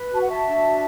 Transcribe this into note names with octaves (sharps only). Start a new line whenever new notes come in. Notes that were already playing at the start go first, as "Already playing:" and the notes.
Already playing: B4
F#4 A5
F#5
E5 A5
D4